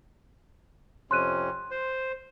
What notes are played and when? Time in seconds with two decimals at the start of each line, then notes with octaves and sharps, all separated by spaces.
1.11 F2 C3 C#4 C6 F#6 D#7
1.71 C5